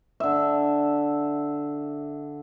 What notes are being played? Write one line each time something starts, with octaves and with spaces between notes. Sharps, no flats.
D3 E5